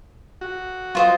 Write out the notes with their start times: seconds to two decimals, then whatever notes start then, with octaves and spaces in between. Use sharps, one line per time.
0.41 F#4
0.95 F#3 F4 C5 D#5